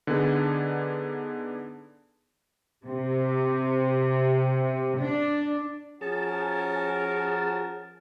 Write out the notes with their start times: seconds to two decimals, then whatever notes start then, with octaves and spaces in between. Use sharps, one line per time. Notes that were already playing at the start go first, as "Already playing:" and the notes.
0.07 D3 B3 D4 D#4 G#4 A4
2.85 C3
4.99 D4
6.01 F3 C#4 F#4 G#4 A#4 A5